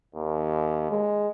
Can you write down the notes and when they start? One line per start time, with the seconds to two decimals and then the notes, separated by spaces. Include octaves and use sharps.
0.15 D#2
0.91 G#3